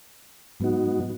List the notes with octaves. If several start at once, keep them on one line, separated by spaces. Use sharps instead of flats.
G#2 F#3 B3 D#4 F#4